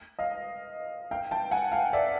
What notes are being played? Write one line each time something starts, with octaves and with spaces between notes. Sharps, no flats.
D#5 F5
F5 G5
G5 A5
F#5 G#5
F5 G5
D5 E5